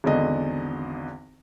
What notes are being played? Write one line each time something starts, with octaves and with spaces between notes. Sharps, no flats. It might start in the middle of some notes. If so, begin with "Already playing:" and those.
G#1 E2 D3 D#5